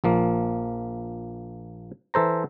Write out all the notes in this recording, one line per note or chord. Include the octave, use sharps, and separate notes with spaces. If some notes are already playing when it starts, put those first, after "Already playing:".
A#1 F3 A#3
E3 A4 C5 A#5